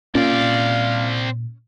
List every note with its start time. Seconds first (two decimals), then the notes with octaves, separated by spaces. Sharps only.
0.15 A#2 C4 C#4 D5 F5